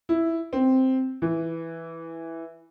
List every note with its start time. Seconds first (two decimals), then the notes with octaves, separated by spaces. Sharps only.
0.09 E4
0.53 C4
1.22 E3